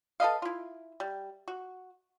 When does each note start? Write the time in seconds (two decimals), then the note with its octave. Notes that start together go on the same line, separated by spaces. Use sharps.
0.20 A4 B4 D#5 F5
0.42 E4 F4
1.00 G3
1.48 F#4